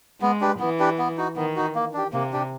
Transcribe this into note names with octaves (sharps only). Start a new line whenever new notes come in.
G#3 B3
D4 G4 B4
E3 B3
D4 G4 B4
B3
D#4 F#4
D#3 B3
D#4 F#4
A#3
D4 G4
C3 A#3
D4 G4